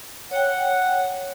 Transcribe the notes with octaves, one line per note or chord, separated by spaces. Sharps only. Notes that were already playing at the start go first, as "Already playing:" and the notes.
C#5 F#5 G5